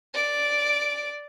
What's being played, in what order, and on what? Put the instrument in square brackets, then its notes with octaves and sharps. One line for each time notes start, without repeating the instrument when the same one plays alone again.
[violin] D5 D7